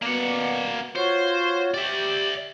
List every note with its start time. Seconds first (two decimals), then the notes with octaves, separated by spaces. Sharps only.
0.02 B2 A#3 D5 F#5
0.96 F4 F#4 C5 C#5
1.74 G4 D5 E5